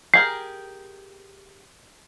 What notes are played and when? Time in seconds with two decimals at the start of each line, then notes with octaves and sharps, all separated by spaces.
0.14 G4 G#4 A#4 C7